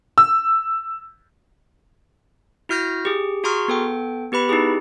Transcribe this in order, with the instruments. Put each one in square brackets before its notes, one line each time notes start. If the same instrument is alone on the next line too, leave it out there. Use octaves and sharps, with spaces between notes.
[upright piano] E6
[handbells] E4 F#4 F6 G6 A#6
G4 G#4
F#4 G#4 A#5 C6 C#6 F6
B3 A4 G5
B3 G4 B4 B5
D#4 E4 G4 G#4